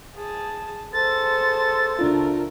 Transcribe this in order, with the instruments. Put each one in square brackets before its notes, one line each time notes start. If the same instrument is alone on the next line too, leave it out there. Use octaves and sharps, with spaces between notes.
[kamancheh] G#4 A5
[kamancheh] G#4 C5 [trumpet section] A4 [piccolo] A6
[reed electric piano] C#2 D4 F4 [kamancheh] A3 A#4